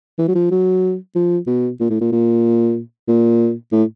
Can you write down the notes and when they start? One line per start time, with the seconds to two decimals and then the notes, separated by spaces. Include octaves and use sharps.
0.18 E3
0.28 F#3
0.35 F3
0.51 F#3
1.15 F3
1.47 B2
1.80 A#2
1.90 A2
2.01 A#2
2.12 A#2
3.08 A#2
3.72 A2